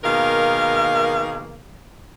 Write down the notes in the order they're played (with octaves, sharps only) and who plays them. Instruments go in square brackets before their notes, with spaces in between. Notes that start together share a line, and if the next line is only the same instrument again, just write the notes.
[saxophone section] B2 D#3 A#3 G#4 A#4 F5